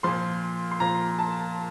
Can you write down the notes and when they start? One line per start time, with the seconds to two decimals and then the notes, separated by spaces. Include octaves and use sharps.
0.03 A#2 F3 C6
0.71 C6
0.80 A#2 F3 A#5
1.19 A5